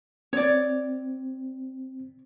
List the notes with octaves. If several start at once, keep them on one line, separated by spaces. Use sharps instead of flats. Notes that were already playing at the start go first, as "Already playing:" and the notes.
C4 C#5 D5